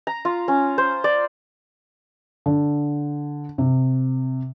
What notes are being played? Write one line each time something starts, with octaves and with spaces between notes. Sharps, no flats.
A#5
F4
C#4
C5
D5
D3
C3